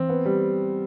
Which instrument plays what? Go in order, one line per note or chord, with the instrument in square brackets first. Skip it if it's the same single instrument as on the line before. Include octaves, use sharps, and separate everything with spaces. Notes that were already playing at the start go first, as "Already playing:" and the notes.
Already playing: [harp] E3 [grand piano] C4
[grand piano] B3
G3